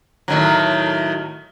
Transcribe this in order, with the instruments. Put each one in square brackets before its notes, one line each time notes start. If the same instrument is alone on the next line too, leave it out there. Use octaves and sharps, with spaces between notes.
[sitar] A2 D#3 F#3